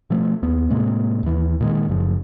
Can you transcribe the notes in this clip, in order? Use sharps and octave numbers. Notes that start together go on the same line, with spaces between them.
B2 F3 A3
D#2 B3
A2 C3 G#3 A#3
D#2 E3
A#2 D#3 G#3
F#1 F#2 C#3 F3